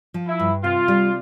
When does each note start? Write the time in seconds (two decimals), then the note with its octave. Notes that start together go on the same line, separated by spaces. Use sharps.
0.14 F3
0.27 E4
0.39 G2
0.64 C3 F4
0.88 G3